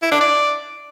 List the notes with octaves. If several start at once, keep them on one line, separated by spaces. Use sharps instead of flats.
E4
D4
D5